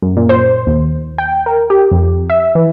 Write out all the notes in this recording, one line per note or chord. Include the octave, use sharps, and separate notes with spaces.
F#2
A#2
C5
D#2
G5
A#4
G4
F2
E5
E3